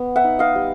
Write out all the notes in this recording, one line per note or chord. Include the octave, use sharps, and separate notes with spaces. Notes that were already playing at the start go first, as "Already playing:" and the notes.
Already playing: B3
E5 F#5
D#4
D#5 F5
G3